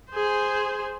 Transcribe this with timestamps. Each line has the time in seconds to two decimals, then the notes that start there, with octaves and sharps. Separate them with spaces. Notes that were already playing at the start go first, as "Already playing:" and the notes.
0.11 G#4 C5